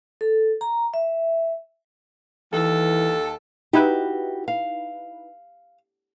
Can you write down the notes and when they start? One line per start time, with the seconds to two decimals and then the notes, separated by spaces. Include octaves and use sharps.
0.21 A4
0.61 A#5
0.94 E5
2.53 D#2 E3 A4
3.73 D#4 E4 F#4 G4 B4
4.48 F5